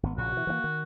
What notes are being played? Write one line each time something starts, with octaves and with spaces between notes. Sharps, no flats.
G#1 B3
A#1 A#2 C#3 F#4
B2 E3
E3 F3 A#3
D#3